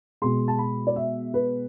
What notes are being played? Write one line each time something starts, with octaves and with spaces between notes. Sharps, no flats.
B2 G#3 C6
A5
B5
D5
E5
B4